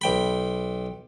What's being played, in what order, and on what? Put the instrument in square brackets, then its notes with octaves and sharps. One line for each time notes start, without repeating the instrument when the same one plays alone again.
[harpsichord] B1 G5 B5